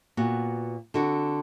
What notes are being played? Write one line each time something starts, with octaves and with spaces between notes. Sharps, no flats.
A#2 B3 F#4
D3 C4 F#4